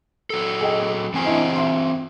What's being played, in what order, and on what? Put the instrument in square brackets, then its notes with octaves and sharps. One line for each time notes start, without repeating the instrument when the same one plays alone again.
[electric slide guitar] F#3 A4
[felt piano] G#4 D#5 G5
[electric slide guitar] E3 C4 G#5
[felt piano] D4 E4 D#5
E5 C6